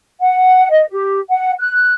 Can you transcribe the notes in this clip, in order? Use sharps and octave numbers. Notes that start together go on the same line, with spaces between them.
F#5
D#5
G4
F#5
F#6